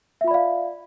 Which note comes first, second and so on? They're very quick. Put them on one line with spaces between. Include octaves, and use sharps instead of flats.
E5 F4 B5 D5 F5